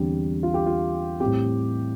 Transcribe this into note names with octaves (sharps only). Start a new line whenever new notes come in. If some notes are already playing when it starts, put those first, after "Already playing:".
Already playing: E2 D3 G3 C4
F4
G4
F4
A2 G3 C4 G4